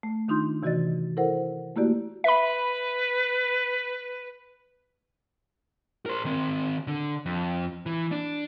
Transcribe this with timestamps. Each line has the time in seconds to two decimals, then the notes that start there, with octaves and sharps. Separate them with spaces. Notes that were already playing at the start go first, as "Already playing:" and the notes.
0.03 A3
0.28 D#3 D4 D#4 F4 C6 G6
0.63 C3 E3 F#4 D5 D#5 A6
1.17 E4 A4 A#4 C5 F#5
1.76 A3 A#3 E4 F#4 G4 D5
2.24 B4 E5 B5
6.06 A#4 C5
6.25 D#3 C4
6.87 D3
7.26 F2
7.86 E3
8.11 D4